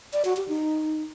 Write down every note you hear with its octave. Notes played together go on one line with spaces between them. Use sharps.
D5
F#4
G4
D#4